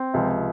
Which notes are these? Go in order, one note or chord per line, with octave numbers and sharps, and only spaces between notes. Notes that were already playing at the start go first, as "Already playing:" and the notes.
Already playing: C4
C#2 C3 F3